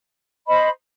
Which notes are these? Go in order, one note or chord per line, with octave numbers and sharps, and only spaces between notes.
C5 D#5 B5